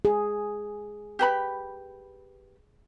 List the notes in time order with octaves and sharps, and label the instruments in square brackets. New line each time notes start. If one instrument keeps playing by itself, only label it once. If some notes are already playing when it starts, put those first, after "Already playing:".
[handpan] G#4
[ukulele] G4 B4 B5